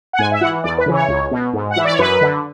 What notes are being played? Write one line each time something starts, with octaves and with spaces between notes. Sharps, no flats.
F#5
G#2 G#5
E5
E3 F#5
E2 D5
B4
C#3 E3
C#5
C#2
B2
G#2
F#5
E3 E5
D5
C#5
F#2 B4
D3